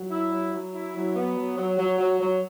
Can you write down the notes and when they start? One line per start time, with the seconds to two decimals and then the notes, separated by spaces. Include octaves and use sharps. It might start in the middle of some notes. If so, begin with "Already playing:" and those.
Already playing: F#3
0.10 E4
0.31 F#3
0.52 F#3
0.73 E4
0.94 F#3
1.15 B3
1.36 F#3
1.56 F#3
1.77 F#3
1.98 F#3
2.20 F#3